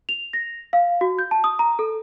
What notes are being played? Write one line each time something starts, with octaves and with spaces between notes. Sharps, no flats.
F7
A#6
F5
F#4
G6
A5
D#6
A#5
A4